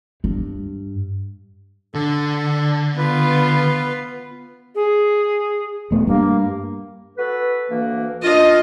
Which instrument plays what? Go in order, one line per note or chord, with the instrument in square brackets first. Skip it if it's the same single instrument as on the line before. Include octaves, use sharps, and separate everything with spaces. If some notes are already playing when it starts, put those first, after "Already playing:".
[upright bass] G2
[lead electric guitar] D3 [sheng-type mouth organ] A4
[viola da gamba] B3 F4 [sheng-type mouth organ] B4
[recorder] G#4
[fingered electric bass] E1 A3 B3
[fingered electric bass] G2 [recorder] A#3
[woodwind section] F#4 A4 B4
D2 E3 A#3
[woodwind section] F#2 D4 F4 [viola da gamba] D#5